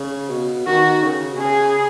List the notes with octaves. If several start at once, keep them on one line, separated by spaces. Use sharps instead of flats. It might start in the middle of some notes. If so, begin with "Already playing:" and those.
Already playing: C#3
B2
D#3 F#4
C#3
B2
C#3 G#4